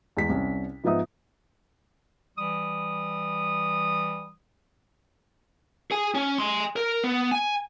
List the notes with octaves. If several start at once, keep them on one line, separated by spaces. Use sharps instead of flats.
E2 G#3 B6
C2 C#4
G#2 F3 B3 D#4 E5 D#6
E3 G3 D#6
G#4 G#5
C#4
G#5 C6
A#4
B3
G#5